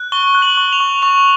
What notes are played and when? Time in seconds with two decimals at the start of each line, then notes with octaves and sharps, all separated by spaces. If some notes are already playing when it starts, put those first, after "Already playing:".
Already playing: F#6
0.12 C#6 G7
0.35 F#6
0.42 F#7
0.57 C#6
0.73 F7
0.80 C#6
1.02 C#6 F7